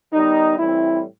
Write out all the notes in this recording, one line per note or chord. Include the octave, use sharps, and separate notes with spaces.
D#3 G3 B3 D#4
A2 E3 G3 C4 E4